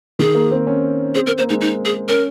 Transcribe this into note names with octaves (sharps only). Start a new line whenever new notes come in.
D#3 G#4
A#3
C4
C#4
C4 G#4
C4 A#4
A#3 C5
G#3 D#4
D#4
G#4
C#4 A#4